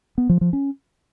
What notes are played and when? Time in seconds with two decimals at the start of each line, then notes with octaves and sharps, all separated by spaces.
0.18 B3
0.29 F3
0.41 F3
0.53 C#4